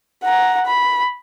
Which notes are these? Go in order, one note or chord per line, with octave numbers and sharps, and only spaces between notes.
F#5 A#5
B5